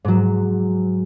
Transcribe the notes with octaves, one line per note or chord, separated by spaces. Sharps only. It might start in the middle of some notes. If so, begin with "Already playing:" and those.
G#2 F#3